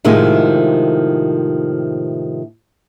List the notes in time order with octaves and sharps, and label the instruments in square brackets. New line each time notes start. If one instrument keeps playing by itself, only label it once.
[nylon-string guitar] A2 C3 D#3 F3 G#3